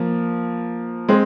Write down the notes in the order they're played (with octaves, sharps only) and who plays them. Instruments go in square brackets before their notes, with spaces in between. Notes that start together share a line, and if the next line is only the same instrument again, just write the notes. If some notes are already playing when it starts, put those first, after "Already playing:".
Already playing: [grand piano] F3 A#3
G#3 C4